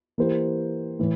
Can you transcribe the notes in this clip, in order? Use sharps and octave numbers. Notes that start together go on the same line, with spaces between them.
E3 A#3 E4 G4 C5
A2 E3